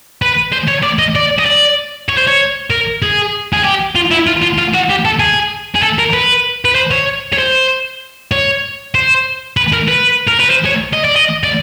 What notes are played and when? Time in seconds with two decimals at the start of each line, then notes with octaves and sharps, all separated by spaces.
0.22 B4
0.53 C5
0.68 C#5
0.83 D5
0.99 D#5
1.15 D5
1.39 D#5
1.46 D5
2.09 C#5
2.18 C5
2.27 C#5
2.70 A#4
3.02 G#4
3.53 G#4
3.64 G4
3.96 F4
4.11 E4
4.27 F4
4.42 F4
4.58 F4
4.74 F#4
4.90 G4
5.05 A4
5.20 G#4
5.75 G#4
5.83 A4
5.99 A#4
6.14 B4
6.65 B4
6.76 C5
6.91 C#5
7.33 C#5
7.38 C5
8.32 C#5
8.95 C5
9.57 B4
9.73 A#4
9.88 B4
10.27 A#4
10.39 B4
10.50 C5
10.65 C#5
10.93 D#5
11.05 D5
11.16 D#5
11.43 D5